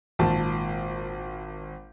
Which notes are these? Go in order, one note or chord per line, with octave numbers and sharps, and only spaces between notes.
G#1 A#2 A5